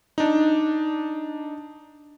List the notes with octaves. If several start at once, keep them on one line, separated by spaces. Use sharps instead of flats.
D4 D#4